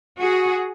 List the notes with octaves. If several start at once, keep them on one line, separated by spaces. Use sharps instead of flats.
F#4 G#4